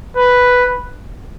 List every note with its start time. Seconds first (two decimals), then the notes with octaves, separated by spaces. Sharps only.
0.17 B4